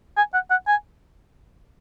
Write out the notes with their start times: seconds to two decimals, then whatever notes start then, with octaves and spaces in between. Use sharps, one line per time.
0.17 G#5
0.34 F#5
0.51 F#5
0.68 G#5